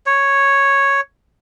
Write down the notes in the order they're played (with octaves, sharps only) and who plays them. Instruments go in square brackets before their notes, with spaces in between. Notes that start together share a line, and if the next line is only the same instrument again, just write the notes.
[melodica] C#5